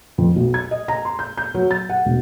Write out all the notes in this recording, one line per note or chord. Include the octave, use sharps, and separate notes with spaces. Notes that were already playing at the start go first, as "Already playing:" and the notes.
F2
B1
G#6
D#5
A#5
C6
G6
G6
F#3
A6
F#5
E1